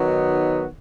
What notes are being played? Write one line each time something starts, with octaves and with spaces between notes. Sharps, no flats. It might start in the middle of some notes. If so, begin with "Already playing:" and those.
Already playing: D#3 F#3 B3 D#4 F#4